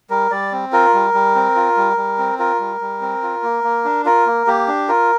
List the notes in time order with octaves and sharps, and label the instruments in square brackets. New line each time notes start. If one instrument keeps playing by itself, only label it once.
[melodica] G3 A#4
G3 D5
C4
F4 A#4
G3
G3
C4
F4
G3
G3
C4
F4 A#4
G3
G3
C4
F4
A#3
A#3
D4
F4 A#4
A#3
A#3 G4
D4
F4 A#4